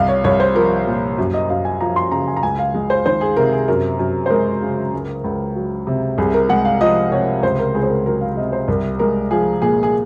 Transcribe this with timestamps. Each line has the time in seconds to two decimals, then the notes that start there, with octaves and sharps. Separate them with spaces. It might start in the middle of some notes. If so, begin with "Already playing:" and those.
Already playing: C2 F5
0.08 C#5
0.24 C2 C#5
0.40 C5
0.55 F3 A#4
0.87 A#2
1.18 F#2
1.34 D#5
1.49 F#2 F5
1.65 G#5
1.81 F3 A#5
1.96 C6
2.11 C#3 A#5
2.27 G#5
2.37 A#5
2.43 C#2 G#5
2.59 F5
2.74 G#3
2.90 C5
3.06 D#3 C5
3.21 G#4
3.37 C3 A#4
3.53 G#4
3.68 F#2 A#4
3.99 F#2
4.26 C5
4.30 G#3 A#4
4.62 C#3
4.93 C#2
5.24 C#2
5.56 F#3
5.87 C3
6.18 C2 G#4
6.34 A#4
6.49 G#3 F#5
6.65 F5
6.81 F3 D#5
7.12 C3 C#5
7.43 C#2 C5
7.59 A#4
7.74 C#2 G#4
7.83 C5
7.90 A#4
8.05 F#3 A#4
8.21 F5
8.37 C3 D#5
8.53 C5
8.68 C2 A#4
8.99 G#3 A#4
9.31 F3 G#4
9.62 A#2 G#4
9.83 G#4